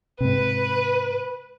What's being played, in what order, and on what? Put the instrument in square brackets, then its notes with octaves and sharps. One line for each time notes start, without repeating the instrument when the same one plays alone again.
[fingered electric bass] G#2 C3 [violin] B4